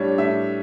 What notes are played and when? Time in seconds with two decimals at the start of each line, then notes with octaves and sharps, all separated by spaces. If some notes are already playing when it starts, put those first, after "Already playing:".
Already playing: A2 G3 D4 C#5
0.18 A2 E5